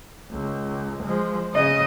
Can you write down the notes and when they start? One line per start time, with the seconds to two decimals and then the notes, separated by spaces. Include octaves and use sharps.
0.31 C#2
1.03 F3 G#3
1.54 C#3 D#5